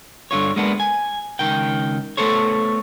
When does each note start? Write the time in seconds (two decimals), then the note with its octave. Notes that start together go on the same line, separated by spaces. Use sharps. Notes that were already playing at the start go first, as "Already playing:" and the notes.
0.31 G2 D3 F4 C#5
0.56 G#3 A#3 B3 D4
0.80 G#5
1.39 C#2 D#3 G5
2.17 A3 B3 A4 C5 C#5